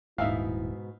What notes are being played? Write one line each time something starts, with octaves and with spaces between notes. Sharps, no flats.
D#1 G#2 B2 D#4 E4 E5 F5